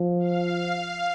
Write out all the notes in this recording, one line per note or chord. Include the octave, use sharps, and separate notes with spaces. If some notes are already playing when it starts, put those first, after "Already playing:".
Already playing: F3
F5